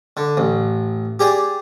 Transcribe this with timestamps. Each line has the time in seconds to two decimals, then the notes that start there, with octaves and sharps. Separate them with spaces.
0.17 D3
0.37 A1
1.19 G4 G#4 D5